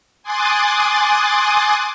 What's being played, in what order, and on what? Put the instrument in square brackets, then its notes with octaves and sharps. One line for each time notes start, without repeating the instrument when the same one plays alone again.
[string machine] G#5 C6 D6 D#6 F#6 A6